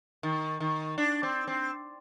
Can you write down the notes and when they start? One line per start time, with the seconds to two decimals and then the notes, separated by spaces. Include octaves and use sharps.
0.23 D#3
0.60 D#3
0.98 D4
1.23 C4
1.48 C4